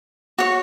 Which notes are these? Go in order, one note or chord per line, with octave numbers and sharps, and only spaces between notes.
F#4 C#5